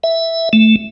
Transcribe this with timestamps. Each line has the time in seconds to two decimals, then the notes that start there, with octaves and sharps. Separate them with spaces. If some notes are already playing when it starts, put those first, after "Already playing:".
0.03 E5
0.53 A3